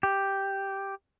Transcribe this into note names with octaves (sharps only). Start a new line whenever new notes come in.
G4